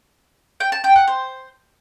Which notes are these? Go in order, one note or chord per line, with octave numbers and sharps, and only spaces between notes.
G5
A5
G5
F#5
C5